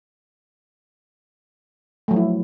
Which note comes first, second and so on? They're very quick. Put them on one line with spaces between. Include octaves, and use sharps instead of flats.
A3 F#3 F3 E4